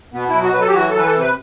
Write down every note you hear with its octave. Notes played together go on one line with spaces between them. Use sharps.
B2 B3
F#3 E4
F#4
F#3 B4
A4
G4
E3 F#4
A4
E3 B4
A4
C3
B4